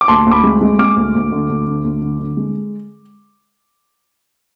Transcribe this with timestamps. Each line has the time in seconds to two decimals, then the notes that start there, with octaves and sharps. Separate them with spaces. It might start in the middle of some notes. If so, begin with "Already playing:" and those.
0.01 D6
0.08 D2 A5 C6
0.26 D2
0.31 B5 D6
0.44 G#3
0.61 G#3
0.79 G#3 D6 F6
0.96 D2
1.15 D2
1.32 D3
1.49 D2
1.67 D3
1.84 D2
2.01 D3
2.19 D3
2.37 G#3